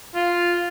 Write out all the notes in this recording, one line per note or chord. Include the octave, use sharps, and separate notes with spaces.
F4